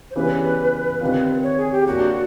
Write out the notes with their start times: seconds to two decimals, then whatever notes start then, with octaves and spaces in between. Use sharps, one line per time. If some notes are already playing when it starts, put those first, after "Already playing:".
0.11 C5
0.16 C#3 E3 G3 B3 B4
1.01 D#3 G3 C4 F4
1.43 C#5
1.58 G#4
1.72 G4
1.86 F#3 A#3 D4 F#4